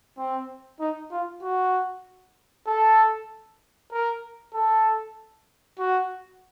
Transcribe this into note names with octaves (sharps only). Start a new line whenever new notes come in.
C4
D#4
F4
F#4
A4
A#4
A4
F#4